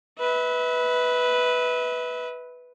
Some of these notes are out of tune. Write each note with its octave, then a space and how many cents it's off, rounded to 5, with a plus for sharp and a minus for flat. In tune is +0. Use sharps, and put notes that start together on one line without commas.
B4 +0 E5 -35